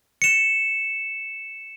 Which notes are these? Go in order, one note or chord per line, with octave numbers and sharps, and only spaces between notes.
C#7 E7